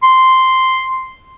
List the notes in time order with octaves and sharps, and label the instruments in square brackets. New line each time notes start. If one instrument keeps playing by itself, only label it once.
[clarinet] C6